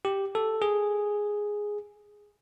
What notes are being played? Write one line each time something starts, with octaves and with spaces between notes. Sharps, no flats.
G4
A4
G#4